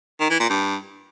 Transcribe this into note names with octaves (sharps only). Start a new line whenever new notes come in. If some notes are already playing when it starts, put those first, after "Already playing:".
D#3
E3
A#2
G2